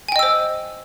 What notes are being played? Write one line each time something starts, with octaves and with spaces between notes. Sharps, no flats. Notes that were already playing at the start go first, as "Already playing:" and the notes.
C5 D#5 G5 G#5 E6